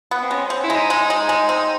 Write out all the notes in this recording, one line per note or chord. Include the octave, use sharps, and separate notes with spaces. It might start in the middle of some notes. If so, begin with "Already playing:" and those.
B3
C4
G#3 C#4
C4 C#4
E4
G#3
D#4
G#3
G#3
G#3
C4